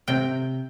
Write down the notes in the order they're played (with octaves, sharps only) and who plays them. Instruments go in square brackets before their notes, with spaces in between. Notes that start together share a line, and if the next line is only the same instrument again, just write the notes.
[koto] C3 G5